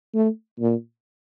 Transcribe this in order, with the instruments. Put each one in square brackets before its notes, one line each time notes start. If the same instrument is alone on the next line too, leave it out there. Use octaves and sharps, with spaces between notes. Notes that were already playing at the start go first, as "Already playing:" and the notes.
[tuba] A3
A#2